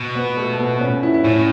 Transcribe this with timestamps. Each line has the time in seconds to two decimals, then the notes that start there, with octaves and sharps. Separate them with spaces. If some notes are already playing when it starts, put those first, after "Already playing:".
Already playing: B2
0.15 B3
0.37 A3
0.53 A3
0.59 B3
0.76 B3
0.81 C#4
1.03 E4
1.14 E4
1.24 A2 C#4